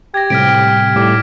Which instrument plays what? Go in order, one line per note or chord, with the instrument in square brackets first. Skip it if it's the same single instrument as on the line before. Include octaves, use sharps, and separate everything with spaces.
[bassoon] G4 [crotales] G#6 A#6
[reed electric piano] A2 C3 G3 [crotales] F6 B6 D7
[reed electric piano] A2 G3 [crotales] D6